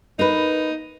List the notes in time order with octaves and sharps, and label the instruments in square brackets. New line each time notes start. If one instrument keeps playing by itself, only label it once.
[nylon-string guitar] A#3 B4 [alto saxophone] D#4